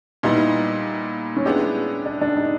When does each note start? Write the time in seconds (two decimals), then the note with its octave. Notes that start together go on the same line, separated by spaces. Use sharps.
0.23 A#2 G3 B3 D#4 E4
1.37 C#4
1.45 G#3 B3 D4 E4 G4
2.06 D4
2.21 D4
2.37 D#4